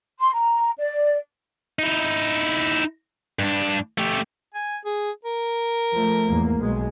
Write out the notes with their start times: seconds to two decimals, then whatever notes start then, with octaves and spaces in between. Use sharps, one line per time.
0.19 C6
0.34 A#5
0.77 D5
1.79 D#4 E4
3.39 G2 D4
3.98 A3 G4
4.55 G#5
4.85 G#4
5.25 A#4
5.93 F3 A3
6.26 E2 G#2 A#3
6.60 B1 B2 G#3